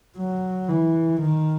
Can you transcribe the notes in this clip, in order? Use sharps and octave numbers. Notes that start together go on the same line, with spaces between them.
F#3
E3
D#3